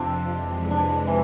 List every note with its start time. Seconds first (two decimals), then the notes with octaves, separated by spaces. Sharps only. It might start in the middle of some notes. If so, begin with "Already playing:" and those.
Already playing: F2 C3 F3 C4 D4
0.33 F2 C3 E3 G#3
0.71 D4
1.07 E3